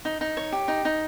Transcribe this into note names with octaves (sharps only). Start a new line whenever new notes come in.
D#4
D#4
C#5
G4
D#4
D#4